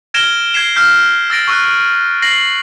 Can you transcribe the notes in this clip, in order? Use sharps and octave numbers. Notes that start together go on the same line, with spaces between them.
F6 G#6 A#6 D7 E7 G7
G#6 B6 C7 E7
F6 G6 B6
E6 A6 A#6 D7
C#6 E6 F#6
A#6 C7 F#7